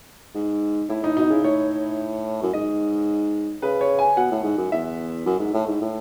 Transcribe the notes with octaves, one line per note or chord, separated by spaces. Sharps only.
G#2
A2 E4
A2 D#4
B2 D#4
C#3 E4
A2 C#5
F#2
G#2 D#5
C#3 B4
C#5
G#5
B2 F#5
A2
G#2
F#2
E2 E5
F#2
G#2
A2
G#2
A2